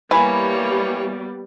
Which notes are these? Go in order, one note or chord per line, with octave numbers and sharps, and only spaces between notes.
E3 G3 A#3 B3 C#5 G#5 B5